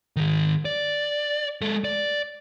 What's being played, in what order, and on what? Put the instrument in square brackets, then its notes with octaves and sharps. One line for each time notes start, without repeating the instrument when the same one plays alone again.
[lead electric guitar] D#3 G#4
D5
G#3 A4
D5